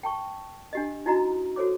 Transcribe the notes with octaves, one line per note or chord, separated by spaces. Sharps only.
G5 A5 C#6
D4 G4 D#5
D#4 E4 F#4 D#5 A#5
F#4 A4 C5 C#5 D6